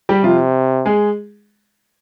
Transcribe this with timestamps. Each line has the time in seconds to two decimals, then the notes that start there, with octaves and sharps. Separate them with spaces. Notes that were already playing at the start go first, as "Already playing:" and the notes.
0.09 G3 G4
0.23 C3 F3 F4
0.85 G#3 G#4